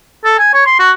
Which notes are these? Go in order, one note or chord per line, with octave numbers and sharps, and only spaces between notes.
A4
G#5
C#5
C6
F#4